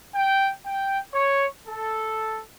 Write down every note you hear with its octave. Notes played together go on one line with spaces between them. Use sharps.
G5
G5
C#5
A4